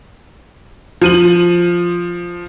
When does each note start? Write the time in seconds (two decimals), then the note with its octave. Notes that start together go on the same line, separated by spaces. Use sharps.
1.01 F3 D#7 F#7